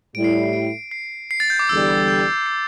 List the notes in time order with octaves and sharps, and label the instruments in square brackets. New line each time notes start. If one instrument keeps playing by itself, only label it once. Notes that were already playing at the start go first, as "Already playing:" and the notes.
[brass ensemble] A2 G3 E4 [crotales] D7
[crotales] C7
D7
C7
D7
C7
C7
A6
G6
D6
[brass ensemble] E2 D3 G3 [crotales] E6
[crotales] G6
C7